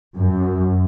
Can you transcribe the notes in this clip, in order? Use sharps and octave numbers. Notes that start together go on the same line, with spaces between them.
F#2